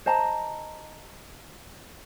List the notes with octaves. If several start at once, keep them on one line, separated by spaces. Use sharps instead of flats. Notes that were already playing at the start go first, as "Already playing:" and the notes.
C5 D#5 A5 A#5